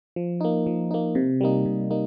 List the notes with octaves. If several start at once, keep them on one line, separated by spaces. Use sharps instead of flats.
F3
A#3 D#4
F3
A#3 D#4
C3
G3 A#3 D#4
C3
G3 A#3 D#4